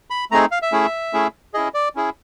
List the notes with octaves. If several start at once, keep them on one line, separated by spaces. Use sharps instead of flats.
B5
A3 C4 D#4 G#4 A#5
F5
E5
A3 C#4 E4 G#4
A3 C#4 E4 G#4
C#4 E4 G#4 D#5
D5
C#4 E4 G#4